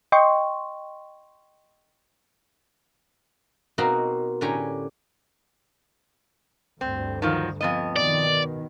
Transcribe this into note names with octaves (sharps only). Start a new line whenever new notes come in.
D#5 G5 C6 C#6
B2 A#3 C4 D#4 F#4 A#4
A2 D3 C#4 G4 G#5 A#5
D2 G2 C4
D#3 F3 F#3
F2 B3 D#5
B2 D#3 D5